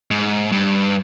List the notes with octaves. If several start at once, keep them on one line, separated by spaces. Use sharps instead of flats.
G#2
G2